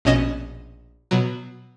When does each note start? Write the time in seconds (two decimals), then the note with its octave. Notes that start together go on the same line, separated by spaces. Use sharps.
0.05 A#1 B2 C#4 D#5 E7
1.11 B2 F#3